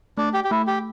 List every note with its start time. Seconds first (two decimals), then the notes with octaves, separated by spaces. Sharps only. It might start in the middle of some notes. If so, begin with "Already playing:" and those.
0.17 A3 D4
0.33 G4
0.44 G4
0.51 A3 E4
0.67 G4